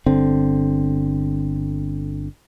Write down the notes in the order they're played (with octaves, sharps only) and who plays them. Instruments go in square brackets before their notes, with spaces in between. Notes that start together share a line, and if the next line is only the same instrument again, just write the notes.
[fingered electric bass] G1 D3 C4